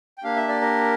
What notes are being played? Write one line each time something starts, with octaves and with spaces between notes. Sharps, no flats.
G5
A#3 D4 G4 F5
E5
D5
A#4